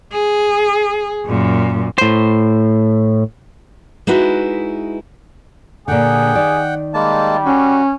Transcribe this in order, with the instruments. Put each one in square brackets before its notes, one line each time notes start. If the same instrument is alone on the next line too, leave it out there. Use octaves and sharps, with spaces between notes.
[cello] G#4
F#2 A#2
[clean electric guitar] A2 C5
[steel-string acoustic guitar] G#3 D#4 E4 F#4 B4
[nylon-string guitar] A#2 D3 [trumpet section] G4 G#4 [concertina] F#5 G5
[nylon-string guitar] D#3 D5
[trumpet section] G3 [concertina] G#3 A#3 A5
[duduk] C#4 [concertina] F#4